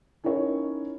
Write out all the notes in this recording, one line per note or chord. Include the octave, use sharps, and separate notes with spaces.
C#4 D#4 E4 A#4 C#5